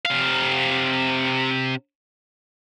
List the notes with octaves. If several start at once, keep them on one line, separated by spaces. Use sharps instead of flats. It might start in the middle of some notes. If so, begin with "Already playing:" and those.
C3 F5